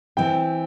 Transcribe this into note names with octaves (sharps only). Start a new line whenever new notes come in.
E3 C4 E4 G5